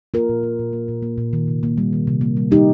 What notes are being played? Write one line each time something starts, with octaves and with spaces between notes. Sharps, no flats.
A#3 F4 A#4
A#2
A#3
A#2
A#3
A#2
A#3
A#2
D#3
C3
A#3
G3
D#3
C3
A#3
G3
G3 D#4 G4